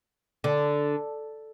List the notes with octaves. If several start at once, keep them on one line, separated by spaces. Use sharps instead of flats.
D3